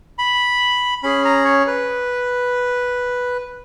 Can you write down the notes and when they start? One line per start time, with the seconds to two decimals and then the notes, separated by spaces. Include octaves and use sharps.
0.19 B5
1.03 C#4 G#4 B5
1.25 A#5
1.45 C#5
1.67 B4